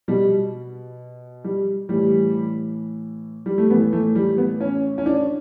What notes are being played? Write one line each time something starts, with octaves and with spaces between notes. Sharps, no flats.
B2 G3
G3
A2 E3 G3
G3
A3
A2 E3 B3
A3
G3
B3
C#4
C#4
D4